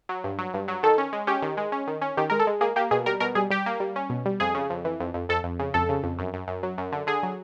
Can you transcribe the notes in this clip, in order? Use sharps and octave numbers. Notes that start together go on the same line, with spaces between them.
F#3
G2
F#3
G2
F#3
D#3 A4
C#4
G#3
C#4 G4
D#3
G#3
C#4
D#3
C#4
D#3 G4
G#3 A#4
A4
G#3
A#3 G#4
A#3 G4
B2 G#4
G3 A#4
B2 A#4
G3 G#4
G3 G4
A#3
G3
C#4
B2
G3
F2 G#4
C#3
F2
E3
F2
F2
F2 A4
F2
C#3
F2 A4
C#3
F2
F#2
F#2
F#2
F#3
F#2
D3
D3 G#4
F#3